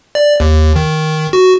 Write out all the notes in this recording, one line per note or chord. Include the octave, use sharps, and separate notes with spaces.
D5
D#2
D#3
F#4